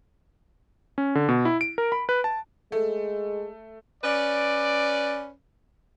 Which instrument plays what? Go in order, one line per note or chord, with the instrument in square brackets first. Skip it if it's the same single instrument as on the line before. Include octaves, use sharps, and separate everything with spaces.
[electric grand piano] C#4
D3
B2
E4
D7
A#4
B5
B4
A5
[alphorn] G#3 [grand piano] A3
[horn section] C#4 B4 D5